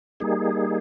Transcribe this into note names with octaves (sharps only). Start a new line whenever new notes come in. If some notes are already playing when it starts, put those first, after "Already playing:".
G3 A#3 D#4 G#4